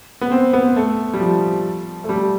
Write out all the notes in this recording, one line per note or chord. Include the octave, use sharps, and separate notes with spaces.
B3
C4
B3
A3
G3
F3
A3
G3